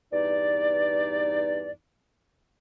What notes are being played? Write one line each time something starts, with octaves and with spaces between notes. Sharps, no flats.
E2 G2 D#4 D5